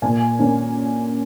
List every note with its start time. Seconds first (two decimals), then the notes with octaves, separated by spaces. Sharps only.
0.02 A#2 G#5
0.39 A#3 C#4